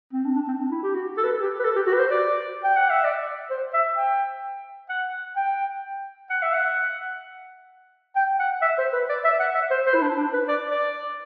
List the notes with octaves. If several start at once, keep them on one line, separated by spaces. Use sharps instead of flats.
C4
D4
D4
C4
D4
E4
G4
F#4
A4
B4
A4
G4
B4
A4
G4
F#4
B4
C5
D5
G5
F#5
E5
D5
C5
E5
G5
F#5
G5
F#5
E5
F#5
G5
F#5
E5
C5
B4
D5
E5
F#5
E5
C5
C5
E4
D4
D4
B4
D5
D5